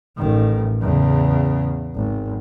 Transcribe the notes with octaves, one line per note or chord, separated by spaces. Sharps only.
A1 D#3
E2 C#3
G#1